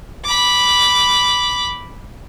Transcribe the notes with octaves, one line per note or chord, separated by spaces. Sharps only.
B5 D6